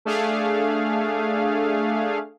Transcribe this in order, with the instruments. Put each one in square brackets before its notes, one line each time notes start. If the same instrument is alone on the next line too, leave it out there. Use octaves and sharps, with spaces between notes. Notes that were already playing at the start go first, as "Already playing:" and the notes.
[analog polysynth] A3 D4 G#4 F5